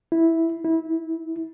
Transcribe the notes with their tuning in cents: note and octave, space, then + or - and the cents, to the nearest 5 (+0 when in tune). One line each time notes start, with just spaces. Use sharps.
E4 -5
E4 -20